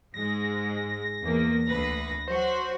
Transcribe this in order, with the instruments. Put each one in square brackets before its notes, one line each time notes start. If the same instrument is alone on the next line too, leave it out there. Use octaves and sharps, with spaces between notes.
[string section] G#2 G#3 [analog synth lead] A#6
[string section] E2 A#3
D2 B4
[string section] F#3 F#4 [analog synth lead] C5